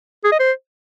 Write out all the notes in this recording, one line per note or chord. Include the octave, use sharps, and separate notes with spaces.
G#4
D#5
C5